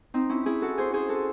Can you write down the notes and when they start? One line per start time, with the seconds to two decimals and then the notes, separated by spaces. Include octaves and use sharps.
0.14 C4 D#4
0.29 C#4 E4
0.46 E4 G#4
0.62 F#4 A4
0.78 G#4 C5
0.94 G#4 C5
1.09 F#4 A4